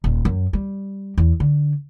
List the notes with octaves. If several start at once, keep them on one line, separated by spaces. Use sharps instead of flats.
D#1
F#2
G3
E2
D3